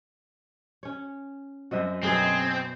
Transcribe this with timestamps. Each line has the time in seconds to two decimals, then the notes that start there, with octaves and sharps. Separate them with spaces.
0.83 C#4 C#5
1.71 F#2 C4 F#4 D#5 E5
2.03 F#2 B2 F#3 A3 B3 C4 G#4